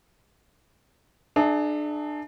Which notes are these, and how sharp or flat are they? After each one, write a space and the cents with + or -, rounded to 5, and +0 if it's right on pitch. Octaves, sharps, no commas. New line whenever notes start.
D4 +30 G#4 +40 E5 +0